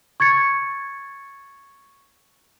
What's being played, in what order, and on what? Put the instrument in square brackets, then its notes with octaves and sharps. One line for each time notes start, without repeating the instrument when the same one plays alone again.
[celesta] C#6 G#6 A6 C#7